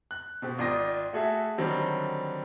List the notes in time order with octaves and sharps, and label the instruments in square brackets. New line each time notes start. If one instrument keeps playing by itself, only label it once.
[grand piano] F#6
B2 C4 G4
G#1 F4 D5 G5 D#6 A#6
A3 F#4 G#4 A4 E5
D3 D#3 F#3 G3 C4